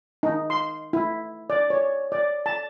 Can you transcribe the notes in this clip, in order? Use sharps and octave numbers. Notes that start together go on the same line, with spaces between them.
D#4
C6
E4
D5
C#5
D5
A5